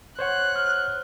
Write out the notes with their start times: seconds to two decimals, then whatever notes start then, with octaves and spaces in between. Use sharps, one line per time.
0.19 C5 C#5 F#5 F#6
0.56 F6